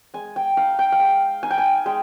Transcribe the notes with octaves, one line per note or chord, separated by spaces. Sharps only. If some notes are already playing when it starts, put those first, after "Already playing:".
G#3 G#5
G5
D#4 F5
G5
F5
G#3 G5
D#4 G#5
G5
G#5
G#3 G5